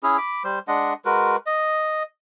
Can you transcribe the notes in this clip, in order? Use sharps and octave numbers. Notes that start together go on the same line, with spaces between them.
C#4 E4 G#4
B5 D6
G3 C5
G#3 D4 D#5 F#5
G#3 F#4 A#4 B4
D#5